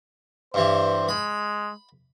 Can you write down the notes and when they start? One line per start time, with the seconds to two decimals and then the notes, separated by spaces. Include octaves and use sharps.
0.54 G2 E3 C5
1.09 G#3 B5